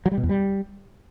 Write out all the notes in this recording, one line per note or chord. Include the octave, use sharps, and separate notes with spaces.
F#3
G3
B2
E2
G3